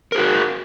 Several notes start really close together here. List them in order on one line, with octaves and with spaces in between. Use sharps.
A#4 G#4 F#4